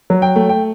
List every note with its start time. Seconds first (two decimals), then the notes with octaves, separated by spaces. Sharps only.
0.10 F#3
0.22 G5
0.36 A3
0.49 G5